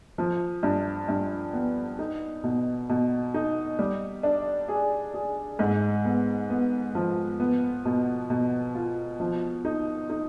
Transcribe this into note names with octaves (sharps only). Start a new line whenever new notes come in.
F3
G2
G2
B3
D#4
B2
B2
D#4
G3
D4
G#4
G#4
G#2
B3
B3
F3
B3
B2
B2
F4
F3
D#4
D#4